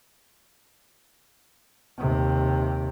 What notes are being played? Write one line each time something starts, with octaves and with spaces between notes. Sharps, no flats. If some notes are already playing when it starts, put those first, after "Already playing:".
D#2 C3